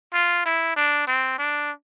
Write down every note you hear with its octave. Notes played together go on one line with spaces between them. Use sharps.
F4
E4
D4
C4
D4